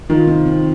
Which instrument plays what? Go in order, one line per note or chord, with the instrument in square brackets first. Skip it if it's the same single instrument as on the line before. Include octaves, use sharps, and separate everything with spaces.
[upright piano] D#3 [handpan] F4
[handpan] C4
C4